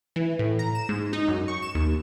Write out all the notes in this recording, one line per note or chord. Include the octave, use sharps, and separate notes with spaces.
E3
A2
A#5
E7
G#2
D#4
F#2
C#6
E7
D#2